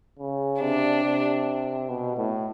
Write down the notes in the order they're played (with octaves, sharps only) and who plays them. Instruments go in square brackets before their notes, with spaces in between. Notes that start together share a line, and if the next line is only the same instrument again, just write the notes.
[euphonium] C#3
[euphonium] C3 [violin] D4
[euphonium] C3
B2
A2